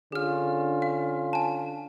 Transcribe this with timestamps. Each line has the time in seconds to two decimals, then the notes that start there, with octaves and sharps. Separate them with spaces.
0.12 D3 C#4 F4 G#4 F6
0.82 F5
1.33 G#5 A5